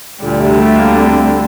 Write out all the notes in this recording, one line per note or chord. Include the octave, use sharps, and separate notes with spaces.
D2 A#2 D3 G3
C3
A3
A#3
C4